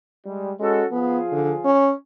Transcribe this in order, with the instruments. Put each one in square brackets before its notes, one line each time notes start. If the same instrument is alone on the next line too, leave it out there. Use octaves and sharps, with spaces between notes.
[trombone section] G3 G#3
[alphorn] G#3 [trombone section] C#4 F#4 A4
[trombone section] F3 F4 G#4 [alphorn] B3
[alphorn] D3
C#4